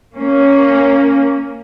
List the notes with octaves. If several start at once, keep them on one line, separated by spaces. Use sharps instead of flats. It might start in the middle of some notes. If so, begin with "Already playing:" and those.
A#3 C#4